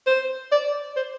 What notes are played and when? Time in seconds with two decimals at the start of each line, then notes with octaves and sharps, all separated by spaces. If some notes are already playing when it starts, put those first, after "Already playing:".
0.07 C5
0.52 D5
0.96 C5